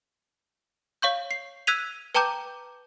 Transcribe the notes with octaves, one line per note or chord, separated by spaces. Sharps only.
C#5 F5 C#6 G6
C7
E6 F#6 G#6 B6 D#7 F7
B4 G5 A5 A#5 D6 G6